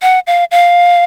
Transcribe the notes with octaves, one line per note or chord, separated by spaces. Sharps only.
F#5
F5
F5